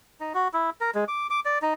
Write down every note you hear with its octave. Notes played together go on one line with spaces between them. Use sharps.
D#4
F#4
E4
A#4
G#3
D6
D6
D5
D#4